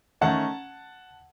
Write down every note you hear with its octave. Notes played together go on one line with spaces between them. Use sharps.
D#3 A3 C#4 F#5 A5